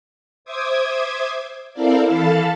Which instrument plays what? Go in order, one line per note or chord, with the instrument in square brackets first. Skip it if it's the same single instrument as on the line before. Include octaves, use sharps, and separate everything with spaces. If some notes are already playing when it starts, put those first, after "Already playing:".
[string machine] C5 E5 D6 D#6 G#6
C4 E4 A4 A#4 D5 F5
E3 A4 F5 A5 B5 A6